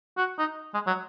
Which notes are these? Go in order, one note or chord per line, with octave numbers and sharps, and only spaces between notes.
F#4
D#4
G#3
F#3